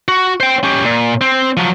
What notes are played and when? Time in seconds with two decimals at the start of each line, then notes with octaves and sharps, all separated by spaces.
0.08 F#4
0.40 C5 G5
0.63 C#4 G4
0.85 A#2
1.21 C4
1.57 F3 F#3